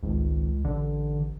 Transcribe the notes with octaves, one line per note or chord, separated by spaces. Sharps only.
G#1 C#2
A1 D3